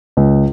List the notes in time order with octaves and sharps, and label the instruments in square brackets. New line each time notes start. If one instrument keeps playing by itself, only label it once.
[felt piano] C#2